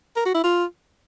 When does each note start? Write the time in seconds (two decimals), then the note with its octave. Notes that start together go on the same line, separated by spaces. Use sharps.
0.16 A#4
0.25 F#4
0.35 E4
0.44 F4